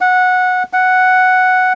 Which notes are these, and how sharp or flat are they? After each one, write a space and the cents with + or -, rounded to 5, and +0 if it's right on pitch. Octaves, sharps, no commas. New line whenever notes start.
F#5 -15
F#5 +0